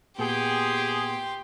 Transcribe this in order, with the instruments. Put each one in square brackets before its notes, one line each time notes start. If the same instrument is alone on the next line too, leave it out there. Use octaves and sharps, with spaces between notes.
[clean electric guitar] A#2 B3 [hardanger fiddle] G4 [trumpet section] G#4 [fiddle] G5 C6